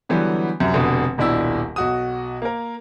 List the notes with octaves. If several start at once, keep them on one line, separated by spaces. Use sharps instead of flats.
D3 E3 F#3 G3 B3
F#2 C3
F1 B2 D3
D#1 B1 D4 E4 E6
B1 F#4 D#6
A#3 A#4